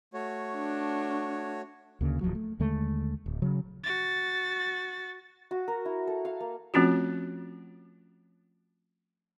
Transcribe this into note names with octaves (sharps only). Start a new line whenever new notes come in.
A3 F#4 C#5
D4
D2 C#3 A#3
D1 G1 F3 F#3
A3
D#2 D3 G#3 A3
D1
C#3 F#3
F#4 A6
F#4
A#4
E4
A4
F5
A#3
F3 A3 C4 C#4 F4 F#4